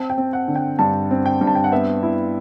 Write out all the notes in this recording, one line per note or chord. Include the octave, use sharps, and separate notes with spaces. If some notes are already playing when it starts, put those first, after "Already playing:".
Already playing: C4 A5
G5
C4
F#5
D3
G5
G2 A5
C4
G5
G2
A5
G5
F#5
B3 E5
E4